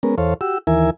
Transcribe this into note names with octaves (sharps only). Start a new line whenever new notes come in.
G#3 B3 C#4 A#4
E2 A4 C5 C#5 F5
F#4 G4 E6
D#2 E3 E4 A#4 E5 G#5